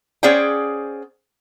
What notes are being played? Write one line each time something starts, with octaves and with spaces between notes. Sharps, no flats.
C#4 G#4 C5 D5 F#5 G5